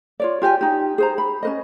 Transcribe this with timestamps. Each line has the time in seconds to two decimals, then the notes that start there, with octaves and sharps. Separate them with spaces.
0.20 F4 C#5 D5
0.42 F4 G4 D#5 G#5
0.61 D#4 G4
0.98 G#4 C5 A#5
1.18 B5
1.43 C#4 B4 D#5